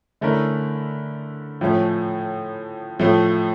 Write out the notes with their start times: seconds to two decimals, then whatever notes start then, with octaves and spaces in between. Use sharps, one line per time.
0.21 D3 A3 C#4 E4 A#4
1.61 A2 F3 A3 C#4
2.99 A2 F3 A3